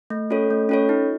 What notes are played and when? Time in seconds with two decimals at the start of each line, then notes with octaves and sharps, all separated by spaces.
0.10 A3
0.30 C#4 F4 A4 C#5
0.51 A3
0.69 C#4 F4 A4 C#5
0.89 D#4